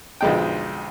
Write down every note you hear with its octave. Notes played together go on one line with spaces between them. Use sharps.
B1 F2 D3 G#3 D#4 G5